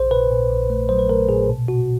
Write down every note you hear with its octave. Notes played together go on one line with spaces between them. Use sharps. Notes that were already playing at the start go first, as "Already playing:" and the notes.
Already playing: A#1 C5
A#2 B4
A#2
A#1
A3
F#3 C5
B4
A3 A#4
A#2 G#4
B2
B2 F#4